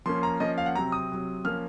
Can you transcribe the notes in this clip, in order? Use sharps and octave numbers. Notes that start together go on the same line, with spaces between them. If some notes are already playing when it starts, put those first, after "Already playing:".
F3 A#3 C#4 C6
A#5
F3 A#3 C#4 D#5
F5
F#5
C3 F#3 C4 A#5
D#6
C3 F#3 C4
F3 A#3 C#4 F6